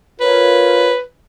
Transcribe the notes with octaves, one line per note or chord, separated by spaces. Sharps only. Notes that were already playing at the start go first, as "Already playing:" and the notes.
F4 A#4 B4 C#5